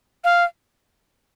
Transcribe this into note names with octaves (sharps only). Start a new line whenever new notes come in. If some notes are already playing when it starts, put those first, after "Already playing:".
F5